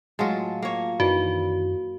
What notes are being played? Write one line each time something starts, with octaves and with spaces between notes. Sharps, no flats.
A2 F#3 G#3 F4 A5
A#3 C#5
F#2 D#3 E3 D4 F#4